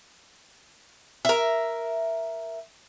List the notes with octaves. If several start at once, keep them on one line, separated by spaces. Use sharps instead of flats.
A#4 E5